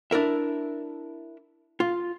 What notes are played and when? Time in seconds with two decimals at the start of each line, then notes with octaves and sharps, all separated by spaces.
0.11 D4 E4 A#4 E5
1.80 F4